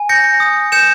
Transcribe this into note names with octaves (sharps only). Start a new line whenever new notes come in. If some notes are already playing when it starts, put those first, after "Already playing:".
Already playing: G#5
G6 A#6 C#7
D#6
G6 C#7 E7